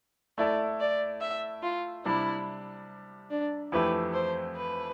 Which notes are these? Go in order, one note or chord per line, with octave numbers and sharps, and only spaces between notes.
A3 E4 A4 D5
D5
E5
F4
C3 G3 D4 E4
D4
F2 E3 A3 E4 G4 B4
C5
B4